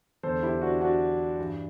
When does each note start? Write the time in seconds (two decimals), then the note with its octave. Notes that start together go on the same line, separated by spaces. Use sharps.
0.23 E2 D3 A4 C5
0.43 E4 G4
0.62 D4 F#4
0.81 D4 F#4
1.38 G2 E3